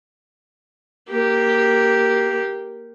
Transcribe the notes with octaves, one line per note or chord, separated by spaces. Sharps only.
A#3 G4